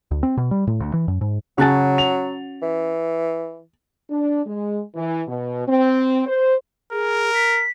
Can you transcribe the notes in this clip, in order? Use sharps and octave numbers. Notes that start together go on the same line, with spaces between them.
D2
C4
B2
G3
A2
D2
E3
F#2
G#2
C#3 F#3 C#4 F#4 A5 A6
F7
E3
D4
G#3
E3
B2
C4
C5
G#4 A#4
B6